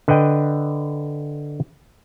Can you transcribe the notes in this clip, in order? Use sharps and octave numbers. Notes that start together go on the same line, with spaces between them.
D3 B4 D#5 G5